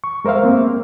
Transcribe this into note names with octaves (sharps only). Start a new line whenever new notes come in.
C#6
G#3 A#4 C5 E5 F5
A#3 C4